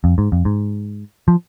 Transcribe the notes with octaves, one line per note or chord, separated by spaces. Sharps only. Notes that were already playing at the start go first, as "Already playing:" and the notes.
F2
G#2
F2
G#2
F3